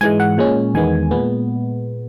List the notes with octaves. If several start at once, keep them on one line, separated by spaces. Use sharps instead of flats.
G#2 E3 G#3 G#5
F#5
A#2 G#3 C#4
E2 D#3 G#3 B3 G#5
A#2 G#3 B3